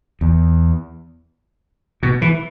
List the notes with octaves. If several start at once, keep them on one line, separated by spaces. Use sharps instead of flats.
E2
B2
E3